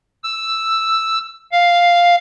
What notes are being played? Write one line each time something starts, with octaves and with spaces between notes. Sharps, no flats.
E6
F5